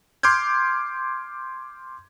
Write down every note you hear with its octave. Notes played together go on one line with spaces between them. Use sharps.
C6 D6 F6 G6 G#6